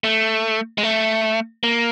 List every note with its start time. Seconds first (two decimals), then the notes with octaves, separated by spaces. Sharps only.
0.04 A3
0.78 G#3
0.83 A3
1.63 A#3